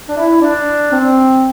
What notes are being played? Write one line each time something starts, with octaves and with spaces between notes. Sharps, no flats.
D4
E4
D4
C4